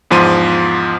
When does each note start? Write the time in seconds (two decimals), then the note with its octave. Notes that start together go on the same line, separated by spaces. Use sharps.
0.11 E2 G#2 F3 C6 D#7